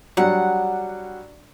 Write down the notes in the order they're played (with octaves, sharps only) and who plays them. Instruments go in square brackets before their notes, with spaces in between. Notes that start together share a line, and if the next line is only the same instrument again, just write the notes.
[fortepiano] F#3 G3 D4 [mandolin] F#5